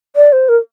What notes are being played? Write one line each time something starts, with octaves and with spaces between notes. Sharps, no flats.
D5
C5
A#4